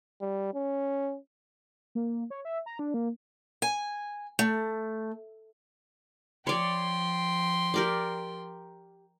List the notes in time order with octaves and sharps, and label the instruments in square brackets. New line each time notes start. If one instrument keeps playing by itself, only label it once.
[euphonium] G3
C#4
[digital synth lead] A#3
C#5
E5
A#5
D4
A#3
[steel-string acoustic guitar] G#5
A3
[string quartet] F3 G5 C6 [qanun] C#5 D5
[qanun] G4 A#4 D5